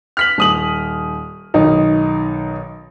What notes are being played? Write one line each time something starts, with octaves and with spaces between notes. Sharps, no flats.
F6 B6 F#7
D#1 D#6 F#7
B1 D#3 D#4